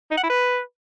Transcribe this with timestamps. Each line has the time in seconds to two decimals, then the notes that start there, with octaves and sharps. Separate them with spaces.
0.11 D#4
0.17 F#5
0.23 E4
0.30 B4